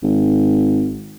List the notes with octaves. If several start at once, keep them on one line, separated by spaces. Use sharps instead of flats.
G#1